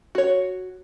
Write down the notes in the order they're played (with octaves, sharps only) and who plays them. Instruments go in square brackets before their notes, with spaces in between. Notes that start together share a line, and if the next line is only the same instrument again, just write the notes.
[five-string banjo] F#4 C#5